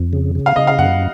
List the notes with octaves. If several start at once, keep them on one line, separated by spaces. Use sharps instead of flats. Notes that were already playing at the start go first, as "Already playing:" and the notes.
Already playing: F2
C#3
C#3
F5
C#3 D#5
F5
F#2 F#5